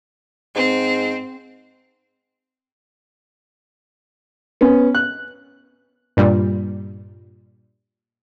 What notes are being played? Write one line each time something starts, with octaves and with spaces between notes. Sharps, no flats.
G#2 C4
B3 C#4
F#6
G2 A#2 G3